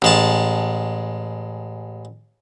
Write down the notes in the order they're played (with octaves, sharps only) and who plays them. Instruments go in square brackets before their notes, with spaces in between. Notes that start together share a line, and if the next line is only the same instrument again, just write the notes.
[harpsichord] A1 G#3 A5